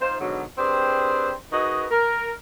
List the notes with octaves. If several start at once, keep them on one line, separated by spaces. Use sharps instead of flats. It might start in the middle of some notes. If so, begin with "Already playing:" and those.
D#4 F4 C5
G#2 B2 D3 F#3
C4 D4 G4 G#4 B4 C5
D#4 F#4 G#4 A#4 B4 D#5
A#4